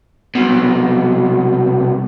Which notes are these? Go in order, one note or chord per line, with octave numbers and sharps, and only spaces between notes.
C2 B2